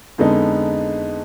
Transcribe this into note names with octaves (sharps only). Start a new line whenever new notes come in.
F2 D3 G#3 B3 D#4